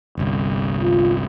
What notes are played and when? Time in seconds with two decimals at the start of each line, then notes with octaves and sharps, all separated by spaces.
0.17 G1 C2
0.81 F4